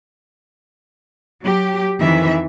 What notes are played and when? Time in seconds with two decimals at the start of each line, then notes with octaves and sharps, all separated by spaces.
1.44 F#3 G4
1.99 F2 D#3 E3 E5